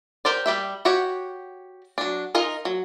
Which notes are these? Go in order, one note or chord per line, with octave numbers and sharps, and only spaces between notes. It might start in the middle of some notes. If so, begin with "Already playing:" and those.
G4 A#4 C5 D5
G3 G4 E5
F#4 G4 C#5 F#5
F#3 D4
D#4 F4 A#4 D#5
F#3